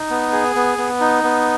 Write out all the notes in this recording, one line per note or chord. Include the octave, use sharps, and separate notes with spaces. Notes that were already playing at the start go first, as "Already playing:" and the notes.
Already playing: D#4
B3
G#4
B3
B3
D#4
B3